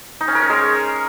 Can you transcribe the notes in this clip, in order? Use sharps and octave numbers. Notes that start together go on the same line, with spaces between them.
D#4
C#4
A#4
C#5
G#3